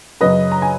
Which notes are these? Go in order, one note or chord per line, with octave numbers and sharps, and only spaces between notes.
F#2 C#3 F#3 B4 D#5
A#5
G#5